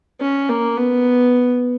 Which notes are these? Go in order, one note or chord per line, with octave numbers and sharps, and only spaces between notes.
C#4
A#3
B3